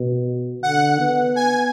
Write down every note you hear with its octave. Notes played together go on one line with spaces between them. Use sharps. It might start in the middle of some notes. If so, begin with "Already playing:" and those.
Already playing: B2
D3 F#5
B3
G#5